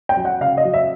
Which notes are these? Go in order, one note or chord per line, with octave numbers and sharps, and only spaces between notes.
G5
F#3
F#5
C#3 F5
D#5
F#3
E5